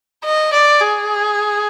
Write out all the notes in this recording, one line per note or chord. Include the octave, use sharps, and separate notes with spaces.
D#5
D5
G#4